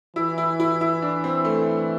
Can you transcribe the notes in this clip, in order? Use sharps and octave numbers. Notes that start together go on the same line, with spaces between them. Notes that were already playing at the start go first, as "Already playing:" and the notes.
E3 E4
E4
E4
E4
D4
C4
A3